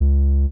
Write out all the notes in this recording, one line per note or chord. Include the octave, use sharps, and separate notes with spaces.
C#2